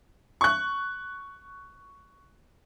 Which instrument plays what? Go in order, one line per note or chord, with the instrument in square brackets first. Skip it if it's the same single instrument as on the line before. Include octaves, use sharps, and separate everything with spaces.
[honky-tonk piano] C#6 F#6